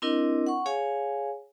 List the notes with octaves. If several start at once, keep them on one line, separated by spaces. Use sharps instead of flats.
C4 D4 E4 A#4 D#5
F#5 C#6
G#4 C#5 F5 G#5